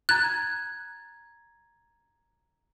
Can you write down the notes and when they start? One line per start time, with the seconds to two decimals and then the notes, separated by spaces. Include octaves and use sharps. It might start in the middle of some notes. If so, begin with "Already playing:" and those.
0.09 A#5 F#6 G#6 A6